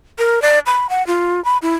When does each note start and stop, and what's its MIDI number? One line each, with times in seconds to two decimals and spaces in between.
0.19 0.42 70
0.42 0.59 74
0.66 0.87 83
0.90 1.05 78
1.07 1.43 65
1.45 1.58 83
1.62 1.74 64